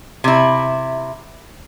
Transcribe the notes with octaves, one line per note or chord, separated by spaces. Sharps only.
C3 E4